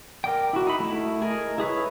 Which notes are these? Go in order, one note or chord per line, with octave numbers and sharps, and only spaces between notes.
A#4 D5 G5
E4 F#4
D#4 B5
A3 E4
G#4 A#4 D#5
E4 G#4 B4 C#5